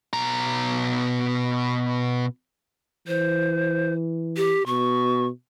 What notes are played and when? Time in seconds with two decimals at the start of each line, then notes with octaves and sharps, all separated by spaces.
0.13 B2 A#5
3.08 E3 C5
4.37 G4
4.66 B2 C#6